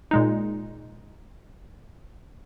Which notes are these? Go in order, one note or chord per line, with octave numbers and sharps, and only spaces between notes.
A#2 G#3 D#4